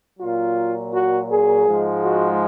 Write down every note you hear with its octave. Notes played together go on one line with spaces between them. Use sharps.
A#2 F#3 F4
F#4
G#4
G#2 F3 G#3
F#4